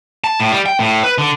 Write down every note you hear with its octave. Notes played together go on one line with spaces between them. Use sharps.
A5
A2
G3
G5
A2
B4
D3